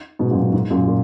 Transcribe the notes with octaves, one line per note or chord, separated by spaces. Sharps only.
G#2 B2
F#2 A#2
F#2
G#2
F#2 A#2
A#2